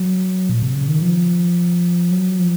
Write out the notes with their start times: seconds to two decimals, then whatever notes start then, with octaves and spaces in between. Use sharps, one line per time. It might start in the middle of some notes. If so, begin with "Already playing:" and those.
Already playing: F#3
0.49 A#2
0.63 C3
0.75 C#3
0.88 D#3
1.02 F3
2.11 F#3
2.39 F3